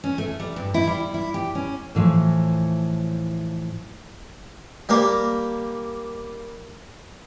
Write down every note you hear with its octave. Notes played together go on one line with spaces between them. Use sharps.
C#4
A3
G3
G2
E4
G3
E4
G4
C#4
A2 E3 F3
G3 A#3